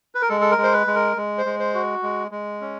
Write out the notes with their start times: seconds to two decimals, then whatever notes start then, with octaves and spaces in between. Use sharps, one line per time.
0.15 B4
0.22 A#4
0.29 G#3 A4
0.41 A4
0.51 A#4
0.58 G#3
0.63 C5
0.72 B4
0.87 G#3
0.95 A#4
1.17 G#3
1.38 C5
1.45 G#3
1.59 C5
1.74 F#4
2.03 G#3
2.31 G#3
2.61 C#4